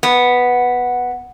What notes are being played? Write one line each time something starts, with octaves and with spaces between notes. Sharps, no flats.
B3